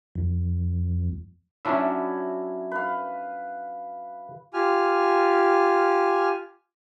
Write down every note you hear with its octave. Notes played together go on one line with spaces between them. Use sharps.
F2
F#3 C#4 D4 E4 E5
B4 F5
F4 G4 G#5 F6